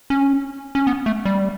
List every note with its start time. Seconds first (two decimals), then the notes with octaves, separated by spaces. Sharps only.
0.10 C#4
0.75 C#4
0.87 B3
1.06 A3
1.25 G3